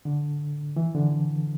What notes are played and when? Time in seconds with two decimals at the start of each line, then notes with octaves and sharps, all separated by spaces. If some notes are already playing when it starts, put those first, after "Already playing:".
0.05 D3
0.76 E3
0.94 D3